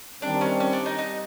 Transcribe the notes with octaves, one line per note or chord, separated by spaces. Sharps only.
D#3 G3 C4 D4
C#4
C#4
D4
D#4
D#4